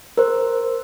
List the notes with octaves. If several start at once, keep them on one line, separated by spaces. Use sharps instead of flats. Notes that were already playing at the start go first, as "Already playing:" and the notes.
A#4 C5